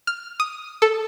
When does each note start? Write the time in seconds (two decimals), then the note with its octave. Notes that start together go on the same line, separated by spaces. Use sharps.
0.07 F6
0.40 D#6
0.82 A4